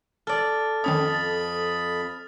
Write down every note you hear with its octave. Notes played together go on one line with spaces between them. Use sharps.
A4 D5 F6 A6
F2 D#3 C#4 C#5 B5 D#6
A6